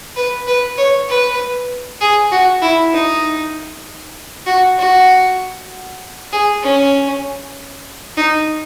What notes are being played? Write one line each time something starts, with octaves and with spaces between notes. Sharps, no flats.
B4
B4
C#5
B4
G#4
F#4
E4
D#4
F#4
F#4
G#4
C#4
D#4